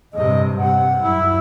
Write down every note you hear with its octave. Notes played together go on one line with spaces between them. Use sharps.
G2 C3 D#5
C3 F#5
F#2 E4